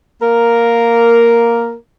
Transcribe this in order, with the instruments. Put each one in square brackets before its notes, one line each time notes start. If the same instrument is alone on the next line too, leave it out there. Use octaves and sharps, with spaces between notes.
[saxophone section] A#3 A#4